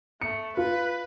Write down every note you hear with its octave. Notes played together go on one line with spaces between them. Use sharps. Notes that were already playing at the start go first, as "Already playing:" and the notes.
A3 C#7
F4 B4